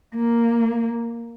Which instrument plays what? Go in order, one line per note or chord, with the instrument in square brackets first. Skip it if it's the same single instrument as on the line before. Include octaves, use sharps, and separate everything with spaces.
[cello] A#3